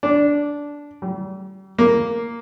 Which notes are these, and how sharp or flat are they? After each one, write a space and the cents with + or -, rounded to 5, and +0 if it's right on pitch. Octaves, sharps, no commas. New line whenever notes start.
D4 -10
G3 -40
A#3 +0